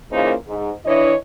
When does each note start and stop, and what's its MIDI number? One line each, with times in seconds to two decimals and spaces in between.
0.11 0.33 46
0.11 0.33 49
0.11 0.33 52
0.11 0.33 58
0.11 0.33 63
0.11 0.33 72
0.47 0.71 44
0.85 1.14 52
0.85 1.14 62
0.85 1.14 64
0.85 1.14 73
0.85 1.14 75